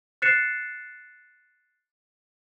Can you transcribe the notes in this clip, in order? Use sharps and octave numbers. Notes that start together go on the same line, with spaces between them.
F#6 A6 C7 C#7 E7